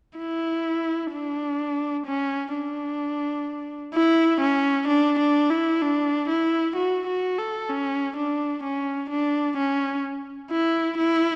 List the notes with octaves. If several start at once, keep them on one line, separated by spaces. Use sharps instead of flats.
E4
D4
C#4
D4
E4
C#4
D4
D4
E4
D4
E4
F#4
F#4
A4
C#4
D4
C#4
D4
C#4
E4
E4